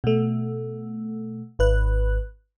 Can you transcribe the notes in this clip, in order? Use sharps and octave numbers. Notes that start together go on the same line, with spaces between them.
B2 A3
G#1 B4 F#6